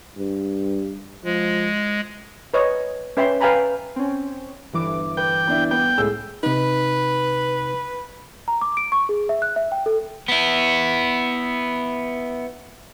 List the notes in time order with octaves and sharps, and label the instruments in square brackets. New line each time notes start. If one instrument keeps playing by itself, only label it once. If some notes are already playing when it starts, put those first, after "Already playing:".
[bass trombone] G2
[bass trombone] F3 [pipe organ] G#3
[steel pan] B4 C#5 D#5
C#4 B4 E5 G5 C6
B4 F5 G5 G#5 A#5 B5
[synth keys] C4 C#4
G1 E3 D6
[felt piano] B4 [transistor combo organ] G5
[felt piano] B3 D4 E4
[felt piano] B3 [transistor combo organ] G5
[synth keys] C#2 A2 [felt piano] G#4 E6
[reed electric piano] C3 D#4 [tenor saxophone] B4
[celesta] A#5
D6
D7
C#6
G#4
E5
F#6
E5
G5
A4
[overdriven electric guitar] B3 E4